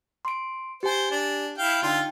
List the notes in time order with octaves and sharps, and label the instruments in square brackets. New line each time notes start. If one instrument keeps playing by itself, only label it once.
[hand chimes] C6 D7
[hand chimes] G4 G#5 [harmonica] C5
[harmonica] D4
E4 F5 G5
[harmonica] D3 F4 [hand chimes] D#4 G5